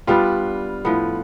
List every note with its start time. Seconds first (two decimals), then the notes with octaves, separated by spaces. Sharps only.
0.07 G3 B3 D4 F4
0.85 A2 F3 B3